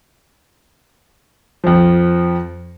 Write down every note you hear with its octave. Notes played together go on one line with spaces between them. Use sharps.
F2 F3